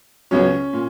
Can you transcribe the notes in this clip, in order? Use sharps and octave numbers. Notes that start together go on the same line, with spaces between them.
C#2 B2 F#3 C#4
A#2